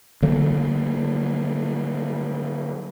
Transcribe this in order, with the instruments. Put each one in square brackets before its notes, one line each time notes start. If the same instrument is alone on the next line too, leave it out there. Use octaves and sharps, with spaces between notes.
[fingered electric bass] D3 F#3 A#3